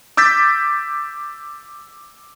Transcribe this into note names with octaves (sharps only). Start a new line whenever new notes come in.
D6 E6 G6 A6 B6